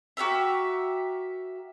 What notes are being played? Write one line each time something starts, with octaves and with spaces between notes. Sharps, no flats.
F#4 G4 A#4 E5